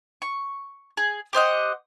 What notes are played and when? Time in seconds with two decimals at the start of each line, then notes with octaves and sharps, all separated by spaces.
0.22 C#6
0.97 G#4
1.33 G4 C5 D#5 F#5